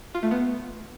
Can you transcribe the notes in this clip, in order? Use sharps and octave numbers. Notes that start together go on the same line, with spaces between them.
F4
A3
B3